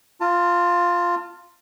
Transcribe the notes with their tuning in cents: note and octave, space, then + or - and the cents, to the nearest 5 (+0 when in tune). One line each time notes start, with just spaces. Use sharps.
F4 +0 A5 +35